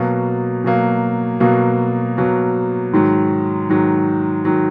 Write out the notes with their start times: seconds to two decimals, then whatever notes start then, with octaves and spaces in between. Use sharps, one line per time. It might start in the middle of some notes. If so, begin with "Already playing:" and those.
Already playing: B2 F#3 A#3
0.64 B2 F#3 A#3
1.40 B2 F#3 A#3
2.17 B2 F#3 A#3
2.93 G#2 D#3 F#3
3.69 G#2 D#3 F#3
4.45 D#3 F#3